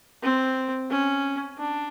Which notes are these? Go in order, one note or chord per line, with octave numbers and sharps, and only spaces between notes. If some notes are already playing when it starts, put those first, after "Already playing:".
C4
C#4
D4